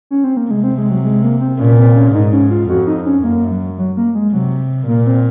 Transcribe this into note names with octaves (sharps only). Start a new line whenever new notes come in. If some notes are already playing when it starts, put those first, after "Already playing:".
C#4
C4
A#3
C3 G#3
C4
G#3
F#3
G#3
A#3
C4
A#2 C#4
C4
C#4
G#2 D#4
C#4
F4
F2 F#4
D#4
C#4
F#2 A#3
F#3
F#3
A#3
G#3
C3 F#3
A#2 A#3
C4